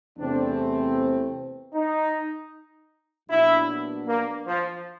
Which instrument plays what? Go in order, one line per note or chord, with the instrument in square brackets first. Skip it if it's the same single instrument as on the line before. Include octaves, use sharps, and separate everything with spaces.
[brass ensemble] E2 C3 E3 A3 C4 [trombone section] D4
[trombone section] D#4
[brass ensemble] A#1 A#2 F#3 B3 D4 [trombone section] E4
[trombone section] A#3
F3